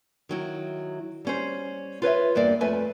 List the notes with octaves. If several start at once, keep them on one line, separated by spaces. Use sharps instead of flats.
D#3 F#3 E4
G3 C#4 C5
F4 B4 C#5 E5
E2 G2 A#3 D5
F2 A3 B4 E5 G#5